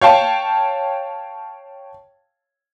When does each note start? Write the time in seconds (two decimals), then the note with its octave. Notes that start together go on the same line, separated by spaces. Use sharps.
0.01 C#5 F5 G5 A5